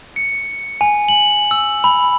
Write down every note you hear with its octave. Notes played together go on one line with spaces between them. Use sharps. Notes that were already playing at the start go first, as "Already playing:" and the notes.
C#7
G#5
F#7
E6
B5